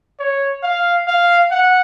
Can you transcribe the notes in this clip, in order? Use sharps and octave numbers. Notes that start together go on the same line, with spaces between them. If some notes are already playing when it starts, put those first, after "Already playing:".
C#5
F5
F5
F#5